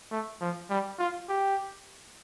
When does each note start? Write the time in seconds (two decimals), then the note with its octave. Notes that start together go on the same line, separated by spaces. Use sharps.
0.11 A3
0.41 F3
0.70 G3
0.99 F4
1.29 G4